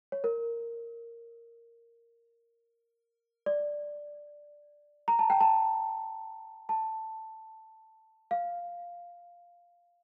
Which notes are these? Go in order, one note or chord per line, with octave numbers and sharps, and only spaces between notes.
C#5
A#4
D5
A#5
A5
G5
A5
A5
F5